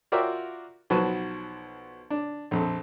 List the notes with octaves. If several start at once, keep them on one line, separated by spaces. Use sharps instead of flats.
F4 F#4 A#4 D5 E5 G5
B1 F3 F#3 F#4 B4 A5
D4
A#1 F2 A4